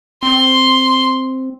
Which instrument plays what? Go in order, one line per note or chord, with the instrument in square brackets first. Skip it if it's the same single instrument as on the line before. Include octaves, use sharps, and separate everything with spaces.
[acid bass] C4 [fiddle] C6